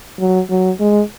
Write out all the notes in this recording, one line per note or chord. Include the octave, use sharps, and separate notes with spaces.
F#3
F#3
G#3